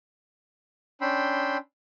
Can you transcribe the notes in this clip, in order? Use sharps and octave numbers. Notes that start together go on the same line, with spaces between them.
C#4 D4 G5 B5 C6 E6